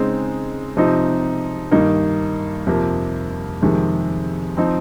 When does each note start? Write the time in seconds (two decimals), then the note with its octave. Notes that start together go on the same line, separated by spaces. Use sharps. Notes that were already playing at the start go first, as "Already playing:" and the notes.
Already playing: C#3 G#3 C4 D#4
0.77 C3 F3 C4 D#4
1.71 G2 D#3 A#3 D#4
2.67 F2 C3 F3 A#3
3.62 F2 C3 D#3 G#3
4.57 F3 C4 D#4